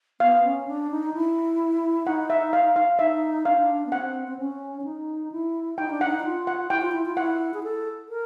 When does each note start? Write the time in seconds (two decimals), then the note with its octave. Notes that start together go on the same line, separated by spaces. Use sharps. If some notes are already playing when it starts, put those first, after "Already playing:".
0.20 B3 F5
0.44 C#4
0.68 D4
0.91 D#4
1.14 E4
2.06 D#4 F#5
2.30 E5
2.53 F5
2.76 F5
2.99 D#4 E5
3.45 D4 F5
3.53 D#4
3.60 D4
3.86 B3
3.92 C4 F#5
4.28 C4
4.39 C#4
4.81 D4
4.84 D#4
5.32 E4
5.78 D#4 G5
5.91 D4
6.01 F#5
6.04 D#4
6.20 E4
6.24 F4
6.47 F#5
6.70 E4 G5
6.82 F4
6.92 E4
7.05 F4
7.17 E4 F#5
7.54 G#4
7.63 A4
8.09 A#4